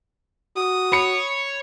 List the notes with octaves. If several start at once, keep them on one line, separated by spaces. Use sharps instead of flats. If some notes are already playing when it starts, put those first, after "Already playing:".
F#4 D#6
C#5 B5 C#7